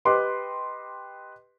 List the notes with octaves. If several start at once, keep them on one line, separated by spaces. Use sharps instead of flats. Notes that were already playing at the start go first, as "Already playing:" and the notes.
G4 B4 D#5 C6 D6